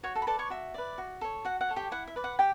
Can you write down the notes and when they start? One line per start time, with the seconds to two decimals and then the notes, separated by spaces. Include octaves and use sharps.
0.03 F#4 C#5 C#6
0.15 A4 A5
0.22 B5
0.27 A4 B4 D5 A5
0.39 C#5 C#6
0.50 F#4 E5
0.74 B4 D5
0.98 F#4
1.21 A4 C#5
1.45 F#4 F#5
1.61 F#5
1.69 A4 C#5
1.76 G4 G5
1.91 E4 F#5
2.07 E5
2.16 B4 D5
2.24 F#5
2.39 G4 G5